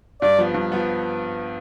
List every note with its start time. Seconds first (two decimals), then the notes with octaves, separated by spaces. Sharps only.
0.22 G2 D5
0.38 F3 B3
0.54 G2
0.72 F3 B3